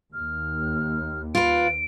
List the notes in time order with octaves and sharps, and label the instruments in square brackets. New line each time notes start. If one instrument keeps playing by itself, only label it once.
[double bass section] D#2 [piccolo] F6
[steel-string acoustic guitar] F4 B4 [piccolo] D7